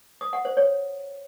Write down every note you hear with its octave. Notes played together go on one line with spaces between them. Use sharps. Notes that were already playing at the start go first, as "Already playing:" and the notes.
D#6
F#5
C5
C#5